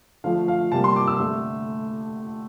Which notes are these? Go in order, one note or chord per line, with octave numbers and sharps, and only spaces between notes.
D3 F3 A3 F5
F5
C3 G3 A#3 A5
C6
D6
E6
D3 A3